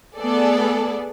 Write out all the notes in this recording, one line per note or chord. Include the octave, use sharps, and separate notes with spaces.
A3 B3 G#4 A4 D5